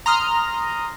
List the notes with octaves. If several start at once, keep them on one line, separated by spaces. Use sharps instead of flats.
A#5 C6 D#6 F6